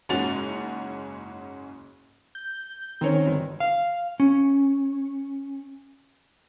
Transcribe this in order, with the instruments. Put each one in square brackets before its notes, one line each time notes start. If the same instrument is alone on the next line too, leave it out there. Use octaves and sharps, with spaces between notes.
[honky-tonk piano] F#1 G#2 C#4 F#4 A6 F7
[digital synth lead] G6
[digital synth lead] D#3 [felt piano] C4 C#4 C#5
[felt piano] G1
[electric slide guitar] F5
C#4